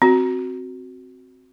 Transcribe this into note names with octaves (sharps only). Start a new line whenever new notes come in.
C4 F#4